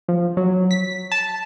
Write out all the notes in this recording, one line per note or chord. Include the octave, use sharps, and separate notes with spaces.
F3
F#3
B6
A5